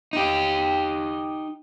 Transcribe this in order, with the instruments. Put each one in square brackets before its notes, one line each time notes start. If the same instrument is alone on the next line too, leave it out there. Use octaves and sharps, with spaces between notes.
[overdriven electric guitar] D#4 G4